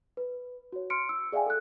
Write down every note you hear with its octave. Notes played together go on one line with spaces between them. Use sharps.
B4
F#4 C#5
C6 F6 C#7 D7
E6
G#4 D5 E5 F5 G5 G#5
A4 F#6